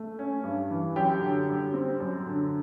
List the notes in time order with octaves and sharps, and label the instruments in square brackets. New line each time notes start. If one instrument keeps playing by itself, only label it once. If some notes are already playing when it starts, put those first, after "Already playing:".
Already playing: [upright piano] A3
C#4
G2
E3
F#2 G4 G5
D3
G3
C4
F#2
D3